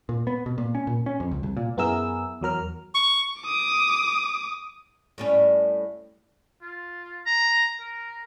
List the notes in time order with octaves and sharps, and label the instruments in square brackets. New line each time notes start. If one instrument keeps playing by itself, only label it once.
[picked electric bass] A#2
B3
B2
A#2
C#4
A#2
C#4
F2
C#2
C2
A#2
[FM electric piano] F#2 B3 E4 G#4 A#4 E6
E2 F#3 A#4 F6
[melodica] C#6
[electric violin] D6 D#6
[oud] A2 G3 C#4
[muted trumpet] F4
A#5
A#4